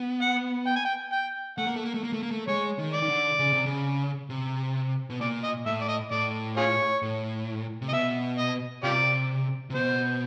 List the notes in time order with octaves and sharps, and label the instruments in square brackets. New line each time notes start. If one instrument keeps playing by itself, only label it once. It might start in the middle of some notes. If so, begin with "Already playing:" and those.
Already playing: [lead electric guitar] B3
[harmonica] F#5
G5
G#5
G5
G5
[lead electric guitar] A3 [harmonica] F#5
[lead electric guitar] A#3
A3
A#3
A3
A#3
A3
A#3
A3
[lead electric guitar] G#3 [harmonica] C#5
[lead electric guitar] D#3
[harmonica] D5
[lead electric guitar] D#3
D3
C#3
C3
C#3
C3
B2
[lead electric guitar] A#2 [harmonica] D5
[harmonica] D#5
[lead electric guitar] A2 [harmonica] E5
[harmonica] D5
D#5
[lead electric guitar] A2 [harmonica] D5
[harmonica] F4 G#4 C#5
[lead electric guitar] A2
C3
[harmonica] D#5
[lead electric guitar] B2 [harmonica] E5
[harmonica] D#5
[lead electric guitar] C3 [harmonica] F4 G4 D5
[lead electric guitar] C3
[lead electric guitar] B2 [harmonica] C5